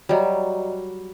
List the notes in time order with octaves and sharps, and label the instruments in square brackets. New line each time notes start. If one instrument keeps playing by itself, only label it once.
[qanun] F#3 G3 [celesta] D5 D#5 A#5